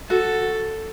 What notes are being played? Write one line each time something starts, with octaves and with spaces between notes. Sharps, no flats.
F#4 A4